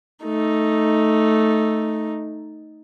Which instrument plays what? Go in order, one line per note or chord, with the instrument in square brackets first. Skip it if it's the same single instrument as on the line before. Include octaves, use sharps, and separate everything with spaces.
[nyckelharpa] A3 D#4